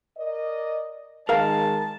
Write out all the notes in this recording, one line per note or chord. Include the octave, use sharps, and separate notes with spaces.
A#4 D5 D#5
D#3 G#3 A#4 F5 A5